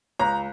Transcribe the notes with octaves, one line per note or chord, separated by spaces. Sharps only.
C#2 A#5